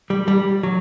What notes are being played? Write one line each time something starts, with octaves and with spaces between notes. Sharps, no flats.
G3
G3
F#3